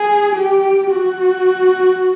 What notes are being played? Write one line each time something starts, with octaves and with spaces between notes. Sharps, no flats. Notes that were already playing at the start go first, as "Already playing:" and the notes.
Already playing: G#4
G4
F#4